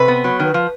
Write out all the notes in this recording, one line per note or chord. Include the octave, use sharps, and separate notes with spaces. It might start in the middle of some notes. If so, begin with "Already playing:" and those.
Already playing: C3 B4
B3
F#3
D#3
F3